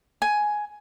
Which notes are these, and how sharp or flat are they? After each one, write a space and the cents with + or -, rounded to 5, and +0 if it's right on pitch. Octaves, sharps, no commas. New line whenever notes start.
G#5 +10